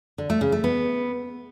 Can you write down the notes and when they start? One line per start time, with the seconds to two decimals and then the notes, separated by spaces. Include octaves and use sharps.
0.18 D3
0.30 A3
0.41 C#3
0.52 A3
0.64 B3